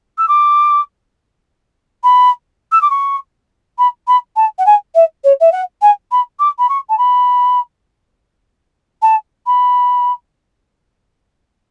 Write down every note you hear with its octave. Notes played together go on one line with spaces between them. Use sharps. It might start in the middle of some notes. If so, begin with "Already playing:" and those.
E6
D6
B5
E6
D6
C#6
B5
B5
A5
F#5
G#5
E5
C#5
E5
F#5
G#5
B5
D6
B5
C#6
A5
B5
A5
B5